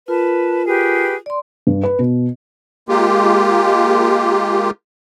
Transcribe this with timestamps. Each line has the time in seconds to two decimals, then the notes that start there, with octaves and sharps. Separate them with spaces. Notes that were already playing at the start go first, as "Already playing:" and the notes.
0.08 F4 A#4 B4 A5
0.66 G4 G#4 B4
1.26 D5 C6
1.67 G2
1.83 B4
1.99 B2
2.89 G#3 A#3 F4 G4